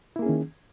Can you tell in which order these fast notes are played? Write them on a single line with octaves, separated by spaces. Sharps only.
E4 A#3 G#4 C#4 D#3